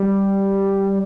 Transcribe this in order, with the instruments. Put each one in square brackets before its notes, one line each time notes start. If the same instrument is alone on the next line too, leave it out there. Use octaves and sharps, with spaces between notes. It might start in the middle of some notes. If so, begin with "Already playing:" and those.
Already playing: [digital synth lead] G3